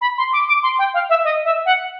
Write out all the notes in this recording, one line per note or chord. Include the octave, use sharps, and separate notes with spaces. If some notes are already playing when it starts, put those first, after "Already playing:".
B5
C6
D6
D6
C6
G5
F5
E5
D#5
E5
F#5